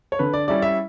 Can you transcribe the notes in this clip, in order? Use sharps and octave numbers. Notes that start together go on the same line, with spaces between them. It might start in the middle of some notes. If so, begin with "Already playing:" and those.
C#5
D3 B4
D5
G3 C#4 E4 D5
E5